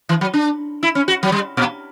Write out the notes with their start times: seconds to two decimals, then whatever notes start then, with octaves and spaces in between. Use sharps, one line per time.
0.09 E3
0.21 F#3
0.33 D4
0.83 E4
0.95 C#4
1.08 F#4
1.23 F#3
1.32 G3
1.57 A#2